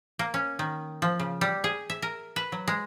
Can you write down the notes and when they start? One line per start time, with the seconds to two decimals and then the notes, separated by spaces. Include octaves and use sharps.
0.19 A#3
0.34 C#4
0.59 D#3
1.02 F3
1.19 C#3
1.41 G3
1.64 G#4
1.90 E5
2.02 A#4
2.36 B4
2.52 F#3
2.67 G#3